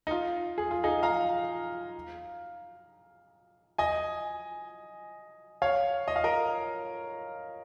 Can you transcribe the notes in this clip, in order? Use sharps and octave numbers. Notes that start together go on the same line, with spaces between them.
D#4
F4
G#4
F4
D#4 G#4
F5 A#5
D#5 G#5
C#5 F5
D#5
F5
A#4 D#5